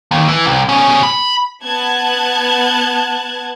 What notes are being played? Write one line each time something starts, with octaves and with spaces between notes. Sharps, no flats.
D#2
E3
C2
B2 C#4
B5
B3 A5 F#6 G#6